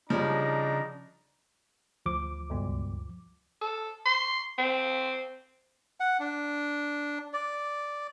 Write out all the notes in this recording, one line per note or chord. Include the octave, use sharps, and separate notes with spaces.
C#3 F3 G3 D4 D#4 A#5
D2 F3 D6
C#2 G2 B2
A4
C6
C4
F#5
D4
D5